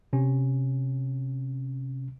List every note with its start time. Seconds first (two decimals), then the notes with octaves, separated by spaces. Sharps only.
0.13 C3 C#4